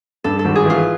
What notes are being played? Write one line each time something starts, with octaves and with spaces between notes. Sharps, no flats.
G2 A4
A4
G#1
G#4
E3 F4